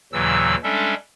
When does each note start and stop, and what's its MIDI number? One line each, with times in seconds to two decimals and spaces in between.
0.13 0.55 39
0.13 0.55 46
0.13 0.55 49
0.13 0.55 52
0.13 0.55 54
0.13 0.55 88
0.64 0.94 55
0.64 0.94 56
0.64 0.94 61
0.64 0.94 62
0.64 0.94 69
0.64 0.94 76